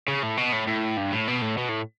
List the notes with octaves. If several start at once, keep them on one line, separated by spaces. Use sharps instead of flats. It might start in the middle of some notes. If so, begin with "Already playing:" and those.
C#3
A2
B2
A2
A2
G2
A2
B2
A2
B2
A2